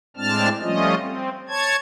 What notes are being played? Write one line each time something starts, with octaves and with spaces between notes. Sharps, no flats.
A2 G#3 C4 D4 A5 F6
F3 G3 A3 C#4 F4 D#5
C4
C#5 A5 G#6